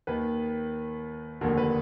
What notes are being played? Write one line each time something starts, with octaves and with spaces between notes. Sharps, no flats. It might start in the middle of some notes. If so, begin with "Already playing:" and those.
D#2 D#3 B4
F1 D#2 D3 A#4
B4